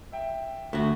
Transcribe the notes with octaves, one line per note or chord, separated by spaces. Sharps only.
E5 G5
D2 A3 F#4